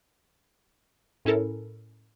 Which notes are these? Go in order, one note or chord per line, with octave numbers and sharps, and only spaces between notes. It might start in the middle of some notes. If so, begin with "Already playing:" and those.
A2 C#4 E4 A4 A#4